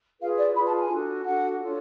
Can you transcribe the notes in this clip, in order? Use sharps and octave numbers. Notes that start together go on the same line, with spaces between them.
F4 G#4 B4 F5
D5
F4 G#4 B4 B5
A5
G#5
D4 F#4 A4
D4 F#4 A4 F#5
D4 F4 A4 C#5